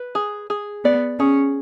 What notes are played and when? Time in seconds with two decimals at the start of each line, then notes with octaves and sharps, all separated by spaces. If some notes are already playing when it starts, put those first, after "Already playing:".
Already playing: B4
0.15 G#4
0.50 G#4
0.84 B3 D5
1.20 C#4 G#4